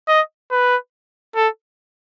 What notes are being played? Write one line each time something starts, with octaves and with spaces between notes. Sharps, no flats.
D#5
B4
A4